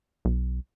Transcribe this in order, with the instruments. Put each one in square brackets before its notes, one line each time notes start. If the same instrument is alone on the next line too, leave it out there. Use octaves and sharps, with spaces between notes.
[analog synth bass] B1